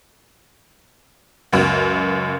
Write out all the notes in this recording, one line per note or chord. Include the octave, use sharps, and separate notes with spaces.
C#2 F#2